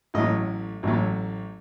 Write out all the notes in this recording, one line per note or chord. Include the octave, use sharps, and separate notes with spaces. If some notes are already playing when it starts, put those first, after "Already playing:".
A1 A2 F#3 D#5
A1 A2 F#3